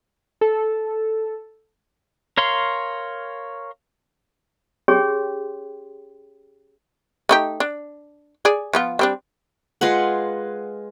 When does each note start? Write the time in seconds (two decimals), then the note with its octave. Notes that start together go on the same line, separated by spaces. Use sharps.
0.41 A4
2.37 A#4 C#5 F5 C6
4.88 C#4 G4 G#4 C#5 G5 C6
7.29 A3 D#4 G4
7.60 D4
8.45 G#4 D5
8.73 F3 B3 F4
8.99 G3 C4 D4
9.81 G#3 F4 B4 F#5